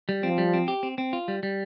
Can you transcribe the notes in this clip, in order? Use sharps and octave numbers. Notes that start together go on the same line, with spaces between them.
G3
F3 C4
G3
C4
G4
C4
C4
F4
G3
G3